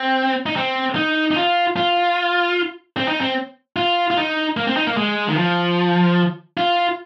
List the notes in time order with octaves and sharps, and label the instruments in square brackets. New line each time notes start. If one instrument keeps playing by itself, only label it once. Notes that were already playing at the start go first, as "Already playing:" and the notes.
Already playing: [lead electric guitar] C4
D#4
C4
D#4
D#4
F4
F4
C4
D#4
C4
F4
F4
D#4
A#3
C4
D#4
A#3
G#3
D#3
F3
F4